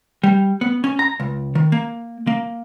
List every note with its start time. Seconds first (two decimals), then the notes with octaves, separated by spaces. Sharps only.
0.24 G3
0.61 B3
0.84 C#4
0.99 A#5
1.20 C#2
1.55 D#3
1.72 A#3
2.27 A#3